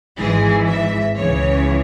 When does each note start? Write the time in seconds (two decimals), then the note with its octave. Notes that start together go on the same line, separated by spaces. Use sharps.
0.17 G#1 G#2 E3 G#4
0.67 E5
1.15 C#2 C#3 E3 C#5